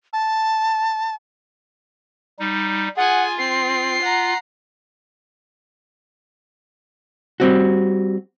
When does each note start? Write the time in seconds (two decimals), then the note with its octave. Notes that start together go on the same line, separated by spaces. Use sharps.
0.13 A5
2.39 G3 D#4
2.97 F4 G#4 F#5 G#5
3.38 C4 C7
4.02 F#5 A#5
7.40 G3 C4 F#4